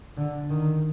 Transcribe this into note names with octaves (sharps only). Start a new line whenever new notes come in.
D3
D#3